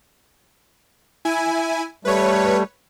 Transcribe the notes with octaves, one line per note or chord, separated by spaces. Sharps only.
E4 G#5
G3 A3 B4 C#5